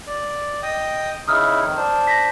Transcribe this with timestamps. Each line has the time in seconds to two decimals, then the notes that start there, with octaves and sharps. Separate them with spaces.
0.07 D5
0.63 D#5 G5 D#6
1.28 C#3 D#4 E4 D#6 F6
1.62 F2 D#3
1.76 D4 C5
2.07 A#6 B6